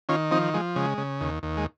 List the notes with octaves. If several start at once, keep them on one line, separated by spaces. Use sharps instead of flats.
D#3 C#4 F4
F3 C4 D#4
F3 G#3
C#3 G#3
C#3
D#2
D#2
G#3